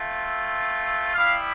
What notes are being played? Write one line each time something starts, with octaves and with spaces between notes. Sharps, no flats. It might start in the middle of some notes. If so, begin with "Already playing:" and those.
Already playing: A3 C4 F4
G3 B3 E4 G4 F5